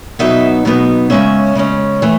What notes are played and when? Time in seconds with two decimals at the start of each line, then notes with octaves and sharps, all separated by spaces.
0.19 B2 F#3 B3 D#4 E5
0.65 B2 F#3 B3 D#4
1.10 C#3 G#3 C#4 E5
1.55 C#3 G#3 C#4
2.02 E3 A3